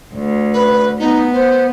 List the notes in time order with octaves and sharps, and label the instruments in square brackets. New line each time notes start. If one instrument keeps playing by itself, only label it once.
[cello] D2
[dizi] B4
[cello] B3 [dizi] D#4
[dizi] C5